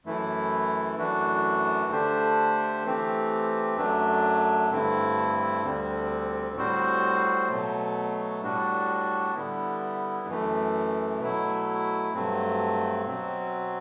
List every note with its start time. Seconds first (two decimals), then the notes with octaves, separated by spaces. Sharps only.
0.05 F#2 E3 A3 E4
0.98 F#2 E3 A3 D4 F#4
1.91 D3 A3 D4 G4 C5
2.84 E3 A3 C4 G4
3.77 F#2 F#3 A3 D4
4.70 G2 D3 A3 C4 E4
5.62 D2 D3 G3 C4
6.55 A2 G3 C4 F#4 C5
7.48 B2 F#3 A3
8.41 A2 G3 D4 F#4
9.34 D3 G3 B3 E4
10.27 F#2 E3 A3
11.20 B2 F#3 A3 E4
12.12 G2 F#3 A3 C4
13.06 B2 F#3 C4